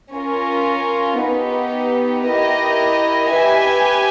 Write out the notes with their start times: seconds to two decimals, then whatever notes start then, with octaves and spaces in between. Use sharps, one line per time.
0.13 C#4 F4 A#4
1.21 B3 D#4 G4 B4
2.28 E4 G4 A#4 D#5
3.35 G4 B4 E5 G#5